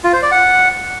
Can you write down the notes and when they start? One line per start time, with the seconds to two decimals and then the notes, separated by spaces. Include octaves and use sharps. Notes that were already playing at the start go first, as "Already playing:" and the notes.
0.04 F4
0.13 C5
0.22 D5
0.32 F#5